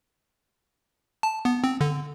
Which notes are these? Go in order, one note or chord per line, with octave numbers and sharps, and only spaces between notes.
A5
B3
C4
D3